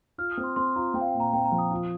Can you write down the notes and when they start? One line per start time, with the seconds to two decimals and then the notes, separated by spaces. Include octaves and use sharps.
0.18 F4 F6
0.31 D#6
0.38 C4
0.44 C6
0.56 C4 C6
0.76 F4 A#5
0.94 C4 G5
1.01 F5
1.07 G5
1.14 A#2
1.20 A#5
1.33 C4 G5
1.45 A#5
1.52 F3
1.58 D#6
1.71 F4